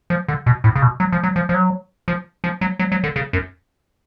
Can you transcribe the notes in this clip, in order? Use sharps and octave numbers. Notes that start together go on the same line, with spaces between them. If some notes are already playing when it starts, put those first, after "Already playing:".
F3
D3
B2
A2
C#3
B2
F#3
F3
F#3
F3
F3
F#3
F3
F3
F#3
F#3
F#3
D3
C#3
F#2